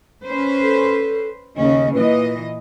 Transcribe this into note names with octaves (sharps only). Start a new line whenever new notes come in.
C#4 B4 C5
A4
D#2 C#3 C#4 D#5
A#2 E3 B4 D#5